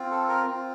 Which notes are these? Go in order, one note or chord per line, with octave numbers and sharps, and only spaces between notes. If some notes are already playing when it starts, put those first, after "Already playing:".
Already playing: C4 F4
A4
A#4
C4 F4